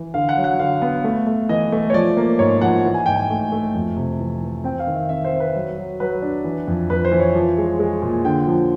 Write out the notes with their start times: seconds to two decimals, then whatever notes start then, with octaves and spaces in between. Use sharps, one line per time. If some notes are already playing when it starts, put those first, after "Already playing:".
Already playing: E3
0.14 D3 F5
0.29 F#5
0.37 F#3
0.44 F#5
0.59 D3 F5
0.82 B3
1.04 A3
1.27 A3
1.49 E3 D#5
1.72 A3
1.90 C#5
1.94 F3 D5
2.17 A#3
2.39 G#2 C#5
2.61 F3 F#5
2.84 E3
2.94 G#5
3.06 G#2 G5
3.16 G#5
3.30 A3
3.52 A3
3.74 F2
3.96 C3
4.19 E3
4.42 E3
4.64 C4 G5
4.79 F5
4.87 D#3
4.95 E5
5.09 C4 E5
5.25 C5
5.32 C4
5.40 B4
5.55 F#3
5.78 F#3
6.00 F#3 B4
6.22 D4
6.44 E3
6.67 F2
6.90 F2 B4
7.05 C5
7.12 E3
7.20 C#5
7.35 F3
7.58 G#3
7.79 G#3
8.02 A#2
8.25 D3 G5
8.47 F3